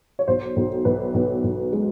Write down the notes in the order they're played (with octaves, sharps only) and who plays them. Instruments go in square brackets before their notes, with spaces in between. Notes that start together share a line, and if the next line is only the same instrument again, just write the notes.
[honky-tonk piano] C#5
B1 C5
B1
B1 B4
B1
B1
G#3